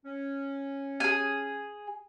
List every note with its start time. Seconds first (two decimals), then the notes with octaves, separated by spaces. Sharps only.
0.05 C#4
1.00 G#4 G#5